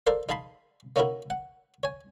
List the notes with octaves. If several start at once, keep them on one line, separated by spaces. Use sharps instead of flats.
A4 A#4 C5 D5 F5
D#4 G#4 F5 A5 B5 C6
A#3 C#4 D#4 E4 F#4 A#4
F#5
C#5 G#5